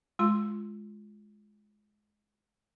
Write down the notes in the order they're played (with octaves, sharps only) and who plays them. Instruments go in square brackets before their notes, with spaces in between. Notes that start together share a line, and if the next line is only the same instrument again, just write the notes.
[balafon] G#3 F4 C6